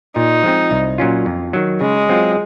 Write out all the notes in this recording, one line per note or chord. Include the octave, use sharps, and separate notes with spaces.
A#2 D#4
F3 G#3 C4
C2
A#2 F#3 C#4 F4
F2
D#3 F#3
C#3 G#3
F#3 C4 F4